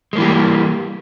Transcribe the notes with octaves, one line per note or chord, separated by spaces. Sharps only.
E3 G3 G#3 A#3